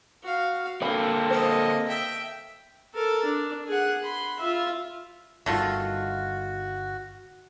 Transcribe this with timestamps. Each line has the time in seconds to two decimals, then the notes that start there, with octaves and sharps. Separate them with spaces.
0.23 F#4 F5
0.82 D3 A#3 C4 A4 B5
1.30 A#3 C5 D#5
1.88 E5 G5
2.94 A4 A#4
3.25 D4
3.68 G#4 F#5
4.04 B5 C6
4.39 F4 E5
5.46 G1 G2 D#3 A3 F4 F#4